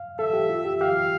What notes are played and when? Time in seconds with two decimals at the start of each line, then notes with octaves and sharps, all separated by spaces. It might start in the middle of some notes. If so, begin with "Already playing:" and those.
Already playing: F5
0.19 A4 E5
0.33 G4
0.50 F4
0.65 G4
0.81 G4 F5